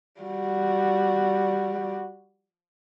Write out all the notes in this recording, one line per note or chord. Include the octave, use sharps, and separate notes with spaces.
G3 F#4